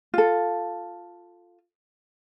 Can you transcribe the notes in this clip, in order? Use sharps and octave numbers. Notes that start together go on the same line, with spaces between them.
F4 A4